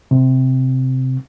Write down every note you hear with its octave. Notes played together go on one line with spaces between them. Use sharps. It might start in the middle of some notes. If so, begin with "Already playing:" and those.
C3